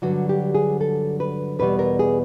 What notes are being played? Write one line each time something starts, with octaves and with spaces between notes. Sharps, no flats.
G2 D3 F#3 F#4
G4
G#4
A4
B4
E2 B2 G3 B3 B4
A#4
G#4